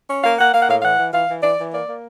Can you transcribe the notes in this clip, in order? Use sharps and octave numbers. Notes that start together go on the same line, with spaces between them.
C#4
A#3 F5
A#3 F#5
A#3 F5
F#5
A2 F5
F5
E3 F#5
E3
E3 F5
E3
E3 D5
E3
A#3 D5
A#3